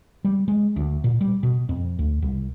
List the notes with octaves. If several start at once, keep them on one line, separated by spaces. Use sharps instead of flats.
G3
G#3
D2
A#2
G3
B2
F2
D2
C2